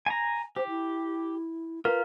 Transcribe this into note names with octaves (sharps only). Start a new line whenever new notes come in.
G#5 A#5
G4 C5
E4
F4 A#4 B4